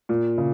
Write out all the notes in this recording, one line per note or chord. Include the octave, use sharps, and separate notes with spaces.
A#2
C#3